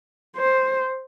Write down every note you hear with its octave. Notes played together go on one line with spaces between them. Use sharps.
C5